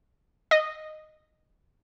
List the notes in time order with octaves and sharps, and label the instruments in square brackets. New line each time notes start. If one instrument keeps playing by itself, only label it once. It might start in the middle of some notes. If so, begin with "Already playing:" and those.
[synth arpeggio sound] D#5